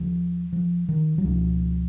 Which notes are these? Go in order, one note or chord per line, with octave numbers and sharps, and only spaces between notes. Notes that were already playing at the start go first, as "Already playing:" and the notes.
Already playing: D#2 C#3 F3
F3
D#3
F#3
C#2 B2 F3